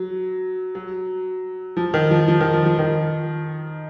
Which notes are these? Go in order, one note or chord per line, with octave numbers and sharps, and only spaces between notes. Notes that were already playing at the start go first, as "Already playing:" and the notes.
Already playing: F#3
F#3
F3
D#3
F3
F3
D#3
F3
F3
D#3